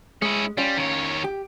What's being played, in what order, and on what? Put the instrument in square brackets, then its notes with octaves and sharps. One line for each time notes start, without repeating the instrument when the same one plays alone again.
[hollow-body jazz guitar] G#3 [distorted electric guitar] C#4 E4
[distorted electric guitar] G3 [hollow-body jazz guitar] C#4 F4
[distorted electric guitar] D#3 C#5
[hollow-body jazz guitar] G4